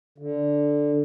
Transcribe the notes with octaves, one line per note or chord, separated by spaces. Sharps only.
D3